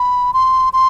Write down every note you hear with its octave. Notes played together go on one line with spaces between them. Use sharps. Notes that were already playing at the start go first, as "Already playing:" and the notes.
Already playing: B5
C6
C6